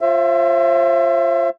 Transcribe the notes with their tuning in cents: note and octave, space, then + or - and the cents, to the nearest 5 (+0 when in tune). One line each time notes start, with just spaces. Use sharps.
F4 +0 C5 +35 E5 +30